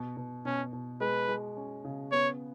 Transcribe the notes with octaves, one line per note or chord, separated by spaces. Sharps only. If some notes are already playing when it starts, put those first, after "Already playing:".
Already playing: B2
B2
B2 C#4
B2
G#3 B4
G#3
C#4
C#3
B3 C#5